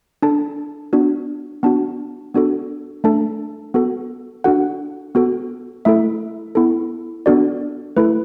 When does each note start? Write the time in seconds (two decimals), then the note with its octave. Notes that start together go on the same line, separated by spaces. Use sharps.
0.22 D4 A4 A5
0.93 B3 D4 F#4
1.63 B3 D4 F#4 A5
2.34 B3 D4 F#4 A4
3.04 A3 D4 A4 A5
3.74 B3 F#4 A4
4.44 D4 F#4 A4 F#5
5.15 B3 F#4 A4
5.85 A3 E4 A4 E5
6.55 B3 E4 A4
7.26 B3 D4 F#4 A4 D5
7.97 A3 E4 A4 B4